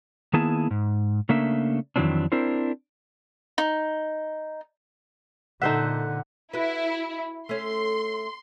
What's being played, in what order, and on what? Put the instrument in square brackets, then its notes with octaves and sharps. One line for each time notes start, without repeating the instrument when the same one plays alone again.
[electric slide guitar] D#3 A#3 B3 E4 G#4 A5
G#2
C#3 A3 A#3 D4 E5
F2 D#3 E3 F#3 C4 D4
C4 D4 E4 A#4 C5
[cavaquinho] D#4
[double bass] A#2 D3 [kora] D#4 C5 E5 [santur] A4 F#5
[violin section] E4 [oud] F#4 B4
[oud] A3 C#4 [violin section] C6